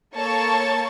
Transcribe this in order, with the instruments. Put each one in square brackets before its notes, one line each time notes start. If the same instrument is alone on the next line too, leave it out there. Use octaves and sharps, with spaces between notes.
[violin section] A#3 A4 C#5 A5 C#6